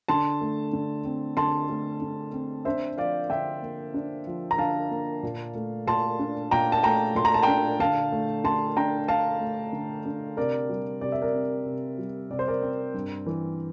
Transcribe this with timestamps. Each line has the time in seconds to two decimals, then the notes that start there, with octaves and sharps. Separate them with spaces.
0.08 D3 A5 C6
0.41 A3
0.73 D3
1.05 C4
1.37 D3 A5 C6
1.69 A3
2.02 D3
2.33 C4
2.65 D4 C5 E5
2.98 F3 D5 F5
3.30 D3 E5 G5
3.62 A#3
3.94 D4
4.27 F3
4.51 A#5
4.58 D3 F5 A5
4.91 A#3
5.23 A#2
5.55 A3
5.87 A#2 A5 C6
6.19 D4
6.51 A#2 G5 A#5
6.72 A5
6.83 A3 G5 A#5
7.15 A#2 C6
7.25 A#5
7.34 A5
7.43 D4 G5 A#5
7.79 D3 F5 A5
8.12 A3
8.44 D3 A5 C6
8.77 D4 G5 A#5
9.08 D3 F5 A5
9.40 A3
9.73 D3
10.05 D4
10.37 C3 A#4 D5
10.69 G3
11.01 C3 D5
11.12 E5
11.22 A#4 D5
11.33 C4
11.66 C3
11.98 G3
12.30 C3 D5
12.39 C5
12.48 A#4 D5
12.62 C4
12.94 G2
13.26 E3